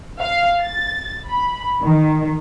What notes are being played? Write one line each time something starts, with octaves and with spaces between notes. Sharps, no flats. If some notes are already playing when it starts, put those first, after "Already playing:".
F5
A6
B5
D#3